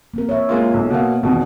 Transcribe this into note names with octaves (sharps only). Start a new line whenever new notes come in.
A#3 C4 A#4
C#5 E5
G#3 A#3 F4
B1
B2 A#3 F5
E1 B2 D#3 C4 D#4